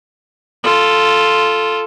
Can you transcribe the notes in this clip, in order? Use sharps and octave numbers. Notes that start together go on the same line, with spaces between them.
F4 A4